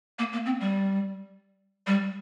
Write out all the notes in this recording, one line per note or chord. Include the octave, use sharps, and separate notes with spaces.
A#3
A#3
C4
G3
G3